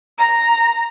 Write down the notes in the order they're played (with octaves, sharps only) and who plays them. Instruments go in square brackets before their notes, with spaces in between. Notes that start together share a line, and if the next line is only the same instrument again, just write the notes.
[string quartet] A#5